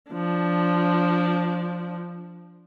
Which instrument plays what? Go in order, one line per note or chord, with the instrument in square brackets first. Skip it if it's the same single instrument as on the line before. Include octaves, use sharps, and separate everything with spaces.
[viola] F3 D4